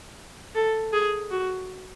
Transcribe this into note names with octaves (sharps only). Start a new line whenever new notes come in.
A4
G#4
F#4